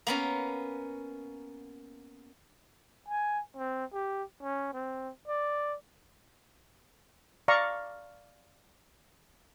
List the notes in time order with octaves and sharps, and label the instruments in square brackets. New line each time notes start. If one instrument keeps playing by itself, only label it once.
[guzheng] A#3 B3 C#4 A#5
[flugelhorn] G#5
C4
G4
C#4
C4
D5
[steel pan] D5 F5 A#5 C#6